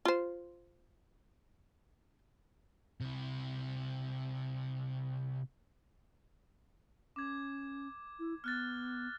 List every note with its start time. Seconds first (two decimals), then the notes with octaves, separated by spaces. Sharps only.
0.05 F4 C5
3.00 C3 E4
7.16 C#4 D6 G#6
8.19 E4
8.44 B3 F6 F#6 A6